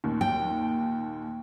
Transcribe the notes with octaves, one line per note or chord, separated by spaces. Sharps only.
D#2 A#2
G5